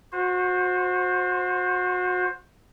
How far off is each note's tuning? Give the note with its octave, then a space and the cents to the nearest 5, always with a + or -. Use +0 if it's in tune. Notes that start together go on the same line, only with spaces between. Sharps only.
F#4 -30 C5 +10